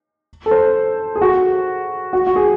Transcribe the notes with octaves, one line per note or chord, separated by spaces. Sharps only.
A4
C5
G#4
F#4
F#4
F#4
G#4